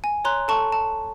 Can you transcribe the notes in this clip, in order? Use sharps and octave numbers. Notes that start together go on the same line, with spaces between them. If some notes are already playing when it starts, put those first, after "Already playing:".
G#5
C#5 A#5 C6 F#6
A4 A5 C#6
A5